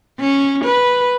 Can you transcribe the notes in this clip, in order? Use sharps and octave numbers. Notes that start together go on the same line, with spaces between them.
C#4
B4